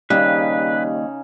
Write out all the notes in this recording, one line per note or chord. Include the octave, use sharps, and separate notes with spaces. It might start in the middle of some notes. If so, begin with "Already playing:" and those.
D#2 C#3 G3 D#4 B4